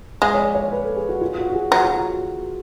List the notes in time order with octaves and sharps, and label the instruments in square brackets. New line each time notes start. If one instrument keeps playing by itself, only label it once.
[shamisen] G#3 [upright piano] F5
[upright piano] C#5
D5
C#5
B4
A4
G#4
F#4
F4
F#4
F#4
G#4
[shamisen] F#3 [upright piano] F#4
[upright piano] F4
F#4